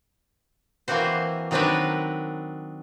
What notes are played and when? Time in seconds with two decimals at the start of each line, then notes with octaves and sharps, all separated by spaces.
0.88 E3 A#3 C4 F#4 C5
1.51 D#3 F#3 C4 D4 A#4 B4